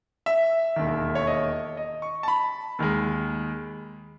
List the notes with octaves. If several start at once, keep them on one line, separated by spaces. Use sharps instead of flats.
E5
E1 D#2 D#3
C#5
D#5
D#5
C#6
A5
B5
D#2 D#3 G#3